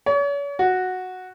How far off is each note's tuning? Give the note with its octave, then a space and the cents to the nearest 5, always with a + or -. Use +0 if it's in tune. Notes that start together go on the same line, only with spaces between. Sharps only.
C#5 +40
F#4 -5